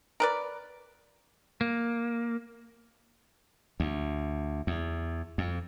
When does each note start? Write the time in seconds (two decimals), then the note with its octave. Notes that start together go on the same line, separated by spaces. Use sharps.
0.20 A#4 B4 D5
1.61 A#3
3.80 D2
4.67 E2
5.38 F2